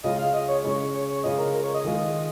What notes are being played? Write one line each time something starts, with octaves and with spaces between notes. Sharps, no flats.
C#3 G#3 C#4 F4 D#5
F5
D#5
C#5
C#3 G#3 C#4 C#5
C#5
C#5
C#3 G#3 C#4 F4 D#5
A#4
A#4
C#5
D#5
D#3 G#3 F4